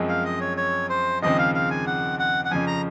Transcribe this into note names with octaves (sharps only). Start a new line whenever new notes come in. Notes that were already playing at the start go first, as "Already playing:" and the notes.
Already playing: F#2 F3 G#3 C4
F5
D#5
C#5
C#5
C5
D#2 C#3 F3 G#3 C4 D#5
F5
F5
G#5
F#5
F#5
F#5
F2 C#3 F3 G#5
A#5